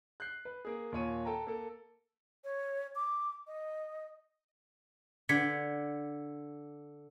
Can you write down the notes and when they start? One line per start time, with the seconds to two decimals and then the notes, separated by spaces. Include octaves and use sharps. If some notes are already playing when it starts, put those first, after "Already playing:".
0.20 F#6 G6 C7
0.45 B4
0.65 A#3 G#4
0.92 D#2 A#2 C#5 D#7
1.25 A4 G5 A5 A#5
1.47 A#3 A4
2.44 C#5
2.95 D6
3.47 D#5
5.29 D3 G#6 B6 C#7